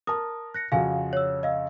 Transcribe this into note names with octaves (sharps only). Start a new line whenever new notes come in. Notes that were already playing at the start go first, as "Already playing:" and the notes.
A#4 A5 D#6
F#6 A#6 C#7
F2 C#3 F#4 F5 G#5
C#5 E6
D#5 F5 E6